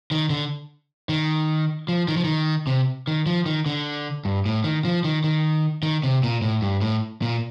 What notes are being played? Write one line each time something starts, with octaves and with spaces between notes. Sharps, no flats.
D#3
D3
D#3
F3
D#3
F3
D#3
C3
D#3
F3
D#3
D3
G2
A2
D#3
F3
D#3
D#3
D#3
C3
A#2
A2
G2
A2
A#2